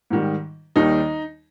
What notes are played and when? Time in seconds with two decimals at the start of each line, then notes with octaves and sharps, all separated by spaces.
0.11 G#2 D#3 G3
0.76 D#2 D#3 G3 D#4